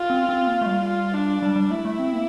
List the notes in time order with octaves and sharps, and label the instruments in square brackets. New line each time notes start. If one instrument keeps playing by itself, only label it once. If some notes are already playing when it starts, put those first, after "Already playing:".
Already playing: [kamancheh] F4
[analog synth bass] C4
C4
A#3
A3
G3
[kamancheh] F4
D4
[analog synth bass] G3 [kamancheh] D4
[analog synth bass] G3
[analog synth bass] A3 [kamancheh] E4
[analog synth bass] A3
C4
A#3